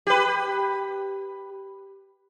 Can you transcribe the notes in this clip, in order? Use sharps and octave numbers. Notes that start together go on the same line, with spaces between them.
G4 B4